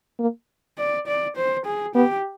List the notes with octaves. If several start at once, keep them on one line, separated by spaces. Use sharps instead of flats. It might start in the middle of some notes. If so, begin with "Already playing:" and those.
A#3
D5
D5
C5
G#4
B3 G4